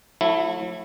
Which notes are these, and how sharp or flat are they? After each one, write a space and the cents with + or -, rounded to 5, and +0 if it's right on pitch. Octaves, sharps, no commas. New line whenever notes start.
F#3 -45 A3 +0 E4 +0